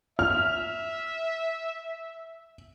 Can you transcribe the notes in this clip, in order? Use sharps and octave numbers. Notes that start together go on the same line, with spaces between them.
E5 F6